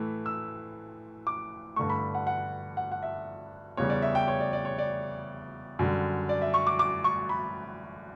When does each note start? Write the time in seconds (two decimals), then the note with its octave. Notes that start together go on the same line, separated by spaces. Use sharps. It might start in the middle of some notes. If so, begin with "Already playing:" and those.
Already playing: A2 E3 A3
0.26 E6
1.27 D6
1.76 G2 D3 A3 C#6
1.90 B5
2.15 F#5
2.27 F#5
2.77 F#5
2.92 F#5
3.03 E5
3.77 E2 C#3 G3 C#5
3.90 D5
4.02 E5
4.15 G5
4.28 C#5
4.40 D5
4.53 D5
4.65 C#5
4.78 D5
5.79 F#2 D3 G3
6.29 D5
6.42 E5
6.54 C#6
6.67 D6
6.79 D6
7.04 C#6
7.29 B5